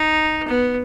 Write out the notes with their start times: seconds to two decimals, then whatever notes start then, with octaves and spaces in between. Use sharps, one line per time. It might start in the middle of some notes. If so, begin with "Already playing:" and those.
Already playing: D#4
0.48 B3